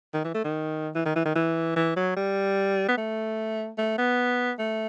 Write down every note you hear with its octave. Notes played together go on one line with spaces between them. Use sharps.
D#3
E3
A3
D#3
E3
D#3
E3
D#3
E3
E3
F#3
G3
B3
A3
A3
B3
A3